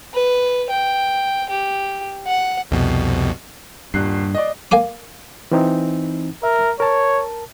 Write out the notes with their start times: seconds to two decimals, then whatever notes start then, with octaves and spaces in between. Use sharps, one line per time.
0.14 B4
0.70 G5
1.50 G4
2.27 F#5
2.71 C2 F2 B2
3.94 D#1 G2 F#6 C7
4.35 D5 D#5
4.71 A#3 G#5 D6
5.51 E3 C4 D#4
6.43 A#4 E5
6.80 A#4 C#5 A5